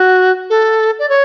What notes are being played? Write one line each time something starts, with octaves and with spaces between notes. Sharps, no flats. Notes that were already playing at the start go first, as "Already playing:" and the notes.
Already playing: F#4
A4
D5
C#5